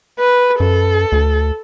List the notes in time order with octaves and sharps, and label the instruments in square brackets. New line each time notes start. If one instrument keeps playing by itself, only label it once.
[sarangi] B4
[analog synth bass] F#2 [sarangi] A4
[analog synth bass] D2